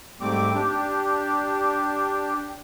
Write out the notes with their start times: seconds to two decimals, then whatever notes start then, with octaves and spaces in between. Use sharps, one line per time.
0.21 G#2 G3 A3 C4 D6
0.54 D4 G4